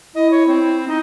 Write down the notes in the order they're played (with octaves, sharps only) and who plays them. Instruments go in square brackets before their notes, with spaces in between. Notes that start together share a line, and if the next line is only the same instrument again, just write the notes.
[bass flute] E4 [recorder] D#5
[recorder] C#5
C4
D#4